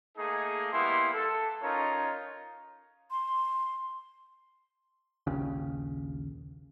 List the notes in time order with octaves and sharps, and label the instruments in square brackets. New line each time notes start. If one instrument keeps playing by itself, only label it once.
[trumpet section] A3 A#3 D#4 G#4
G3 A#3 B3 E4 C6
A4
C#4 D#4 F4 A#4 C#5 A#5
[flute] C6
[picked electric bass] A#1 D#2 C#3